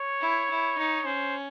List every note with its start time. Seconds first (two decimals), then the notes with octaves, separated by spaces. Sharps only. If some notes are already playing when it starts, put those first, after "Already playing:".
Already playing: C#5
0.21 E4
0.50 E4
0.78 D#4
1.05 C#4 C5